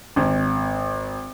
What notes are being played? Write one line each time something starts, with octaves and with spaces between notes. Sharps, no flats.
G#1